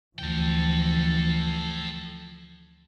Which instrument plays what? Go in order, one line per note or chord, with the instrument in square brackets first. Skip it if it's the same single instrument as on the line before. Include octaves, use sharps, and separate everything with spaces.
[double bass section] D2 E3 F3 [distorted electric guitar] A4 G5